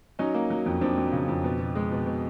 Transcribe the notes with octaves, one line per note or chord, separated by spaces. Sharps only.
F#3 C#4 D#4
A#3
F#3
F2
F2 C4 D4
F#3
C#3
F2
B2
B2
G#3
B2
B2